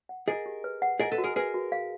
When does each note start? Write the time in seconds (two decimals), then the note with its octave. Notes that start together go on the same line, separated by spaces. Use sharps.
0.09 F#5
0.28 G#4 A#4 D#5
0.46 G4
0.64 B4
0.82 F#5
1.00 G#4 A#4 D#5
1.12 A4 B4
1.18 F#4
1.24 G#4 A#4
1.36 G#4 A#4 B4
1.54 F#4
1.72 F5